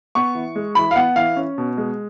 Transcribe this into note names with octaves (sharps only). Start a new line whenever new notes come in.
B3 C#6
E3
G#3
E3 B5
F5
B3 F#5
E3 F5
C#4
B2
G#3